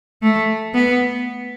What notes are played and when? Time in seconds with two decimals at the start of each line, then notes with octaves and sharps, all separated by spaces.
0.22 A3
0.74 B3